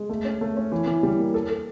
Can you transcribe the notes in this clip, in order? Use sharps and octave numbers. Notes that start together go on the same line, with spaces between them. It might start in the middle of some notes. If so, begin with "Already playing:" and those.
Already playing: G#3
A3
C#4
A3
C#4
E3
E3
G3
A#3
A4
A4